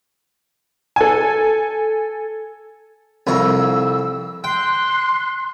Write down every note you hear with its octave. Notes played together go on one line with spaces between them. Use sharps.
A4 G#5
C2 F2 A#5 E6
G5 C6 F#6